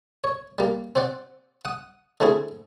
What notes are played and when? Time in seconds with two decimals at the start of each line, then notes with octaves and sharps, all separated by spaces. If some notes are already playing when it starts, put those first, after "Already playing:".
0.24 C#5
0.58 G3 A#3
0.95 C4 C5 D5 F#5
1.65 F#5 D#6
2.20 D3 A3 C4 E4 G#4